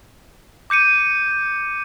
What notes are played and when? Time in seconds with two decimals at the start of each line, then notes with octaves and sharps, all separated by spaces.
0.70 D6 G6 C#7 D#7